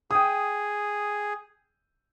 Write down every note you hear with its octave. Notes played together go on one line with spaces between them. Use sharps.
G#4 G5 D#6